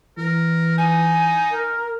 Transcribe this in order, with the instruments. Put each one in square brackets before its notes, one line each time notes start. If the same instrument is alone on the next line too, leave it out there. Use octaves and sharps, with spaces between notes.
[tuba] E3 [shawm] A#4
[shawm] D#4 [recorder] G#5
[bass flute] A#4